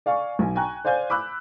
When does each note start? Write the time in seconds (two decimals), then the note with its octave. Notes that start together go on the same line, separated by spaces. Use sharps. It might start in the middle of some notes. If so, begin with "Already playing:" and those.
0.06 D5 F5 G#5 C#6
0.39 B1 G#5
0.55 G5 G#5 A#5 C#6 F#6
0.85 C5 D5 F5 G#5 G6
1.10 B5 D6 E6 F#6